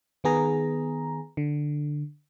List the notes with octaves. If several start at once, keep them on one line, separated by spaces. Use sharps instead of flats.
D#3 B3 G#4 A#5
D3